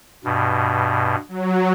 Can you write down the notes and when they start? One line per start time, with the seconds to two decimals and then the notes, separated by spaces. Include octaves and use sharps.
0.25 G2 B2
1.29 F#3